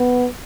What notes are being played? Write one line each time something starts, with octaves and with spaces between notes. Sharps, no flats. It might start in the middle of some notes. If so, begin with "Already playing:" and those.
Already playing: B3